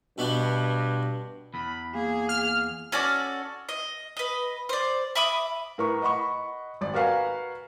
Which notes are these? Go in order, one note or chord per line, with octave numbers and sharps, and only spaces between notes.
G2 B2 B3 D4
E2 B5
A#3 G#4
F6
C#4 F#4 A4 D5
D#5
B4 D#5
C5 D5
E5 B5 D6 D#6
A2 A#4 B4 C#6
D#5 F#5 B5 C#6
G#1 D5
F#4 A#4 B4 F5 F#5 G#5